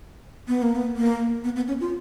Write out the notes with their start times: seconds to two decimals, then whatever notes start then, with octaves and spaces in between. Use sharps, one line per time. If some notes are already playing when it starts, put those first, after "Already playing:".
0.48 B3
0.62 A#3
0.76 B3
0.96 A#3
1.44 B3
1.56 B3
1.68 C#4
1.81 F4